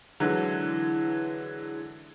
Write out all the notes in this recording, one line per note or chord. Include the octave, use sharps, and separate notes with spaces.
D3 E3 F#3 G#3